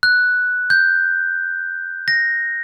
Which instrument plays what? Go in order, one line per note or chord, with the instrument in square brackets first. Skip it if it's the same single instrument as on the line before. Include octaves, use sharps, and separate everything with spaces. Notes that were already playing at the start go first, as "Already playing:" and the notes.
[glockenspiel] F#6
G6
A#6